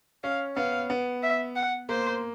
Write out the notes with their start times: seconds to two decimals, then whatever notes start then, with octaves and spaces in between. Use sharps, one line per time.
0.24 C#4 F5
0.56 B3 F5
0.90 B3
1.23 E5
1.56 F#5
1.89 A#3 C5